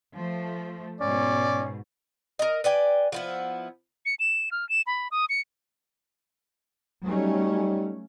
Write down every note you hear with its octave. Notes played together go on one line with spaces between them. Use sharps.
F3 A3
G#2 B2 C#4 D5
A#4 D#5
B4 D5 G5 G#5
F3 B3 E4
C#7
E7
F6
E7
B5
D#6
C#7
F#3 G3 A3 C#4 D#4